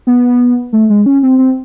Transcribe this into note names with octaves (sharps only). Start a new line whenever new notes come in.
B3
A3
G#3
C#4
C4
C4